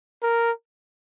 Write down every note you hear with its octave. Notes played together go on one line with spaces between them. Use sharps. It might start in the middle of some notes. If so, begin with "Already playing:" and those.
A#4